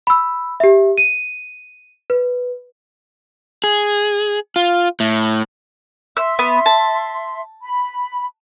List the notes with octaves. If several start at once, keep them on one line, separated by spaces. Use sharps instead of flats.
B5 E6
G4 E5
D#7
B4
G#4
F4
A2
E5 C6 E6
B3
A5
B5